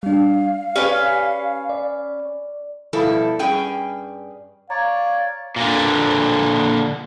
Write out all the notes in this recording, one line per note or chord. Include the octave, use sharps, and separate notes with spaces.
G3 D4 F5
C#4 G4 B4 D5 G#5
D5
B2 F3 G3 E4 A4
G2 G3 C#4 G#4 G5
C#5 D5 F5 A#5
A#2 D3